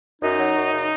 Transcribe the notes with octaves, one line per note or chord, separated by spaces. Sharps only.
F#2 D#4
F#3
F#2
C#3